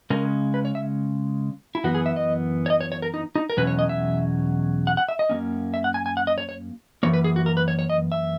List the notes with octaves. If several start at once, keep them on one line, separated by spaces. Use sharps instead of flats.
C#3 G#3 C#4 A#4
B4
C#5
E5
E4
F#2 E3 B3 F#4
G#4
E5
D#5
C#5
D#5
C#5
C#5
A#4
D#4
D#4
A#4
E2 B2 F#3 C#4 B4
C#5
D#5
E5
F#5
F#5
E5
D#5
F#2 D#3 A#3 C#4
E5
F#5
G#5
G#5
F#5
D#5
C#5
C#5
F#2 E3 A#3 C#5
B4
G#4
F#4
A#4
B4
C#5
C#5
D#5
E5